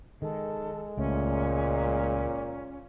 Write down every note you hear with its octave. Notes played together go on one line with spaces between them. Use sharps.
D#3 G#3 A4
C#2 A#2 A3 C#4